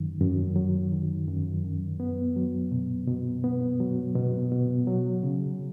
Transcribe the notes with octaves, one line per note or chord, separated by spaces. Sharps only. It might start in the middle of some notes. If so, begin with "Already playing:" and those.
Already playing: F#2 D#3 F#3
F#2
F#3
D#3
F#2
F#2
B3
F#3
B2
B2
B3
F#3
B2
B2
F#3
C#3